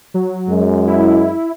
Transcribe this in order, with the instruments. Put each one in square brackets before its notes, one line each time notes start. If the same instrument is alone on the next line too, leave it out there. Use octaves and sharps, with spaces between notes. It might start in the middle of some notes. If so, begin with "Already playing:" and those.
[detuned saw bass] F#3
[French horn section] F#2 G#3
[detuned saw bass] E4